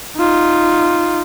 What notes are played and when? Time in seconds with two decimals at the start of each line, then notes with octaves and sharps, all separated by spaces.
0.17 D#4 F4